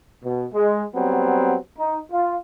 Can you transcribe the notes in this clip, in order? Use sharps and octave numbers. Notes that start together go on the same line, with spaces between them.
B2
G#3
F#3 G3 B3 C4
D#4
F4